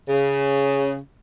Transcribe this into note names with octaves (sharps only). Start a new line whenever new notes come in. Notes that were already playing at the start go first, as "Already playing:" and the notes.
C#3